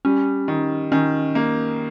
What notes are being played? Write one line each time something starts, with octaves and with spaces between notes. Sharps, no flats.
G3 C#4
D#3
D#3 C#4
A#3